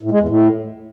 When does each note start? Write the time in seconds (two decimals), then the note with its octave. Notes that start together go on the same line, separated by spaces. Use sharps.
0.03 A2
0.11 G#3
0.20 E2
0.28 A2